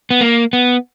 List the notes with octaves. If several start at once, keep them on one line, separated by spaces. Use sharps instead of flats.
B3
A#3
B3